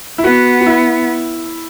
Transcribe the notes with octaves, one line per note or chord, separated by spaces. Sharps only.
E4
B3 F#4
F#4
E4